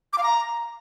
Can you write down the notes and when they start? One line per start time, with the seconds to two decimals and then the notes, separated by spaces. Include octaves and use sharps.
0.13 D6
0.18 F5
0.23 A#5